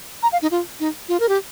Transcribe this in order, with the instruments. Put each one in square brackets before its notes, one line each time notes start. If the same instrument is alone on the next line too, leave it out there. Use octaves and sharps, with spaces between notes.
[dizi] A#5
F5
D#4
F4
D#4
F4
A#4
G4